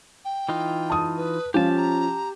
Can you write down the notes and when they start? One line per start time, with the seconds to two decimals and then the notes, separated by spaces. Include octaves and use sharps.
0.25 G5
0.49 E3 D#4 F4
0.90 A5 D#6
1.17 B4
1.54 F3 C#4 G4 F5 A5
1.77 A#5